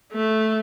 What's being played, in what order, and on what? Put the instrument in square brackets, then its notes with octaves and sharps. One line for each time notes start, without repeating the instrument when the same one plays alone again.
[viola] A3